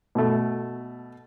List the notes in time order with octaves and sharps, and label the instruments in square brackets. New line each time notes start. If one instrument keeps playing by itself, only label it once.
[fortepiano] B2 A3